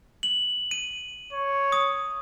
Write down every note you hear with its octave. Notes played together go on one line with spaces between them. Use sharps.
F#7
D#7
C#5
D#6